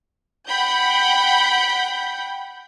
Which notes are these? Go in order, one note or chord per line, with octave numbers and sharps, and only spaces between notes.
F#5 G5 B5 G6